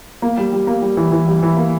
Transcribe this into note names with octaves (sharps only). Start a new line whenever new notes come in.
A#3
G3
G3
A#3
G3
E3
E3
G3
E3
A#3